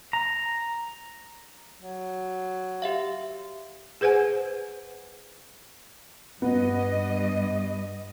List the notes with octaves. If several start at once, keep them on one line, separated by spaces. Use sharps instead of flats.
A#5
F#3
G4 E5 F5
G#4 B4 C5 F#5 G#5
G2 B3 D#5